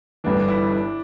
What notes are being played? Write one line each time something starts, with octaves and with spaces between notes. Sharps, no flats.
G1 G2 E3 D4
E4
D4